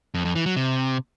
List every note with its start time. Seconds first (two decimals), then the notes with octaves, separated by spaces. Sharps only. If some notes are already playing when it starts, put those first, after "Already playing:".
0.14 F2
0.25 F2
0.35 E3
0.46 F#3
0.56 C3